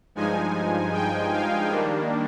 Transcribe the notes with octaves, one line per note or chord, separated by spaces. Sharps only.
G2 F3 G#3 D#4 G#5
G5
F5
D#3 G3 A#3 D4